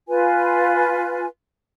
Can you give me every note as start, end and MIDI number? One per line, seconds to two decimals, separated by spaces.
0.09 1.26 65
0.09 1.26 71
0.09 1.26 80